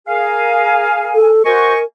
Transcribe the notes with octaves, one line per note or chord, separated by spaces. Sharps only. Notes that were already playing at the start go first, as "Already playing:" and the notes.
G#4 A#4 F5 G#5
A4
F#4 A#4 C5 D#5 G#5 C#6